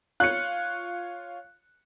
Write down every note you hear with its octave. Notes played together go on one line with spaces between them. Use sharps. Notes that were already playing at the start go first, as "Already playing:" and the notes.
F4 C#5 F#6 C#7